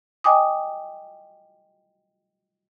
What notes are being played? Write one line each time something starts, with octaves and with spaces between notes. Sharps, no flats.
D#5 G5 G#5 D6 D#6